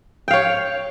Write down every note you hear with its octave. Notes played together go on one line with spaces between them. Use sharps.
C#5 F5 G5